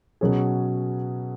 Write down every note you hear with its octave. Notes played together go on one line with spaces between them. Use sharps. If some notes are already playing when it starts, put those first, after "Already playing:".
B2 F#3 C#4 G#4